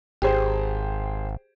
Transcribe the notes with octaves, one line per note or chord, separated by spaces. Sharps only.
G#1 G4 G#4 C5